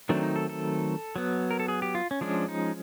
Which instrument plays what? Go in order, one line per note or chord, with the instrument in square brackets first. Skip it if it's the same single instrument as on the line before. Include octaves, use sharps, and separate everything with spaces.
[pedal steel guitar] D#3 F#3 A3 C4 D4
D#4
A4
A4
F#3 B3
A#4
A4
G#4
G4
F4
C#4
F3 G#3 C#4 D4
D#4